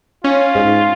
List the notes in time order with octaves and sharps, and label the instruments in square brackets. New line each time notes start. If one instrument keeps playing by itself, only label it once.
[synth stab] C#4 [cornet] F4
[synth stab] G#2